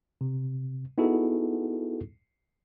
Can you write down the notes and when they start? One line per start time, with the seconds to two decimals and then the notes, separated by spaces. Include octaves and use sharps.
0.21 C3
0.98 B3 D#4 E4 F#4 G#4 A4